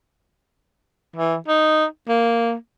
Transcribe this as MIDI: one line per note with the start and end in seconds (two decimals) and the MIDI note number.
1.16 1.36 52
1.48 1.85 63
2.08 2.54 58